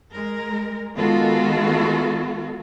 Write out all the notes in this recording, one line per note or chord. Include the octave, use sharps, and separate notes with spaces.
G#3 A#4
D#3 G#3 B3 F4 F#4 A4